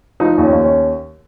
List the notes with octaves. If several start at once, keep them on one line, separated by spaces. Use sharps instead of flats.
F3 D#4
D#2
C#4
D#2
C#4